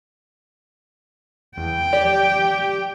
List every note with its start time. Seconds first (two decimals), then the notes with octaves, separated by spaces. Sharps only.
1.58 E2 G5
1.93 G4 D5